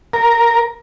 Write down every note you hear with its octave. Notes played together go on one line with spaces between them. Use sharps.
A#4